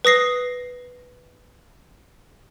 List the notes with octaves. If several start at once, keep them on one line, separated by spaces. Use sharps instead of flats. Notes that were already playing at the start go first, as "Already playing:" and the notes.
B4 D#6 A#6 C7